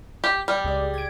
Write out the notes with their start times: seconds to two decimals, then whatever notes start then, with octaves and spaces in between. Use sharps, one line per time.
0.24 G4
0.48 G3 G4
0.64 C#2 G#3 D5
0.94 G#6 D7